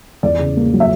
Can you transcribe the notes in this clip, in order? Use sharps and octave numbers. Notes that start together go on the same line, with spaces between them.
E2 D5
C#3
A#3
F#3
E5